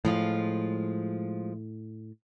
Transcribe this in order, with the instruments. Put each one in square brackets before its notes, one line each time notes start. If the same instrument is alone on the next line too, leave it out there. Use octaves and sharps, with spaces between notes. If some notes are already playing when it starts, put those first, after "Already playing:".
[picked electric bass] A2 [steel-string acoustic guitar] F3 G#3 F4